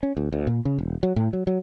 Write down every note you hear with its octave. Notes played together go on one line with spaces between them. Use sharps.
C#4
D2
D2
A#2
C#3
E1
F#3
A2
F#3
F#3